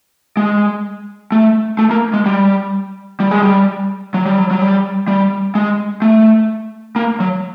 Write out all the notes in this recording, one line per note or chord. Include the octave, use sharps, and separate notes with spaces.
G#3
A3
A3
A#3
G#3
G3
G3
G#3
G3
F#3
G3
F#3
F#3
G3
G3
G#3
A3
A#3
F#3